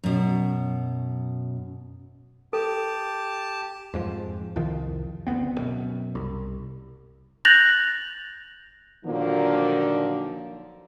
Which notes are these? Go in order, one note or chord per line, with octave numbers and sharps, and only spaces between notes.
F#2 B2
G4 A4 A5
F2 G#2 F3
C2 F2 D#3 F3
F#1 D2 B3 C4
F#2 B2
C2
F#6 G6 A6 A#6 F7 F#7
A#2 D3 D#3 F3 F#3 A#3